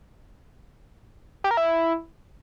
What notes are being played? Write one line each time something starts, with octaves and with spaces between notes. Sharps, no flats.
G4
A#4
E4